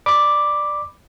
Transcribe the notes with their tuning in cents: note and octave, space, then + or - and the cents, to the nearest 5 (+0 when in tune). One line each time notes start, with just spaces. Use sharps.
D5 +15 B5 +0 D6 +0